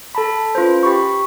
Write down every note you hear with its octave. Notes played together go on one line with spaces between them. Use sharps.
A4 A5 B5
C#4 F4 B4 C5
G4 B5 C#6